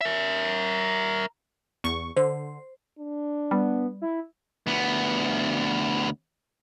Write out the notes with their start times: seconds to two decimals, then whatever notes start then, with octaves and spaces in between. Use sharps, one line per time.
0.01 A#4 E5
1.84 E2 C#6
2.16 D3 C5
2.98 D4
3.51 G3 B3
4.02 E4
4.67 D2 B3